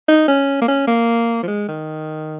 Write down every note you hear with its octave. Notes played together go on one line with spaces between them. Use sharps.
D#4
C#4
A#3
C#4
A#3
F3
G#3
D#3